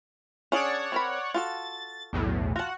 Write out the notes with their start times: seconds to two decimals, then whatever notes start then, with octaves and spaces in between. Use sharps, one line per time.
0.52 C#4 D4 G#4 C#5 D5 F#5
0.92 C4 A#4 B5
1.34 F4 F#4 A4 A6
2.13 B1 E2 A2
2.56 F4 F#4 F#5 A5